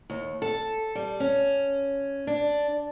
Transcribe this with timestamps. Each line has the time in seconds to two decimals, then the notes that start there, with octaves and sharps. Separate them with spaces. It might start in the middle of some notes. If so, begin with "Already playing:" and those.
0.10 D#2
0.42 A4
0.95 G3
1.20 C#4
2.27 D4